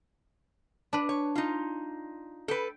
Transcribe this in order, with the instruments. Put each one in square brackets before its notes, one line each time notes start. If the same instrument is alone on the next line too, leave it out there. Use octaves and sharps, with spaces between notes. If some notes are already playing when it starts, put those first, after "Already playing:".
[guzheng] D4 B4
[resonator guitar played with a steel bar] C#5
D#4 F4
[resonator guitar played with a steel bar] A4 B4 [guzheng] G5